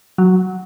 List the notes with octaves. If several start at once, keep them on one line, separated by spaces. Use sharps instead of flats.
F#3